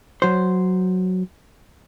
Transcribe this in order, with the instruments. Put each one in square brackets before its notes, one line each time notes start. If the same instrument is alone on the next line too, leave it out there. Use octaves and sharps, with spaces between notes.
[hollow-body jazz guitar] F#3 C5